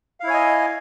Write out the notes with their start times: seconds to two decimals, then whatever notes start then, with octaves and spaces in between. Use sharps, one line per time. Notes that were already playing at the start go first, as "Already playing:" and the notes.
0.20 F5
0.24 E4
0.27 C#5
0.30 G#5
0.34 D#5